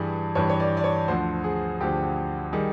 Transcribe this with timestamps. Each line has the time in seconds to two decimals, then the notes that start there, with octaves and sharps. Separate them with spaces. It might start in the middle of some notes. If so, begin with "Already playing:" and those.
Already playing: G2 E3 G3 G#4
0.35 G2 E3 G3 C#5
0.50 C#5
0.60 D5
0.77 D5
0.84 C#5
1.08 D2 D3 F3 C5
1.44 G#4
1.80 D2 D3 F3 G4
2.53 D#3 G3 G#4